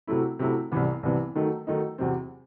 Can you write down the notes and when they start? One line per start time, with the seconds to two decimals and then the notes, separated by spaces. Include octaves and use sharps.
0.07 C3 F#3 A3 E4
0.39 C3 F#3 A3 E4
0.72 C2 C3 E3 B3
1.03 C2 C3 E3 B3
1.36 D#3 F#3 A3 D#4
1.67 D#3 F#3 A3 D#4
1.98 E2 C3 F#3 C4